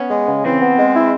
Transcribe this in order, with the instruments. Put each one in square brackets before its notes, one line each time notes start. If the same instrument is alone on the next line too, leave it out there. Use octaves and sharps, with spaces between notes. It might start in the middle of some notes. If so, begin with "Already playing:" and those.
Already playing: [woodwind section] B3 [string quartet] C#4
[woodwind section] G#3
C#3
[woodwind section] E3 [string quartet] C4
[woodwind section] B3
G#3
E4